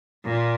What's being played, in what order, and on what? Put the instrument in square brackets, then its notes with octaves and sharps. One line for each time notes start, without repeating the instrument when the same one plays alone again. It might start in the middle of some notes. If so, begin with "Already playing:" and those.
[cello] A#2